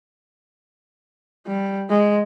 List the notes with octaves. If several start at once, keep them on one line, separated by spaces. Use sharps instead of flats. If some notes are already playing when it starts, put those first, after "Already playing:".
G3
G#3